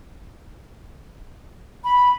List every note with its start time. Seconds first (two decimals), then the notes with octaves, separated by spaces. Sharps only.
1.83 B5